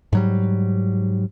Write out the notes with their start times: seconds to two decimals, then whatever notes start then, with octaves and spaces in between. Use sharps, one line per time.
0.13 G#2 F#3 G3